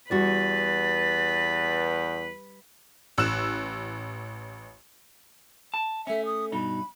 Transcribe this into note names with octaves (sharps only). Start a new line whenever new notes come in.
E2 G3 F#4 B4 A6
A1 E6 F#6 E7
A5
A3 C#4 E5
D#6
G2 B2 D#4 B5